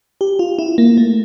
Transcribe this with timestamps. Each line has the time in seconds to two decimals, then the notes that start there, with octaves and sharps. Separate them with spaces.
0.21 G4
0.39 F4
0.59 E4
0.78 A#3
0.97 A3